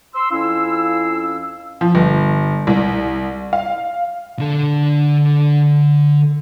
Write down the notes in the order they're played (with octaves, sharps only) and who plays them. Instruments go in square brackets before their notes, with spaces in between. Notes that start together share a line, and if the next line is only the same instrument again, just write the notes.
[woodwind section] C6 E6
F2 C#4 E4 F5 E6
[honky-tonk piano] F3
G1
C2
F5
[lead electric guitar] D3 A4